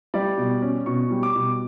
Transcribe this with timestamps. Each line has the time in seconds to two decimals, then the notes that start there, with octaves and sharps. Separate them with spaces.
0.14 G3 D5
0.38 B2
0.62 C#4
0.86 B2 C#6
1.11 G3
1.23 D6
1.36 B2